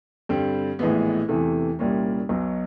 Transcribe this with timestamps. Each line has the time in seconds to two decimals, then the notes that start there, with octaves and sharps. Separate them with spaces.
0.29 G2 D3 G3 C4
0.79 A#1 A2 E3 G#3 B3
1.28 E2 C3 E3 A3
1.79 C2 A#2 G3 A#3 C#4
2.29 B1 B2 F#3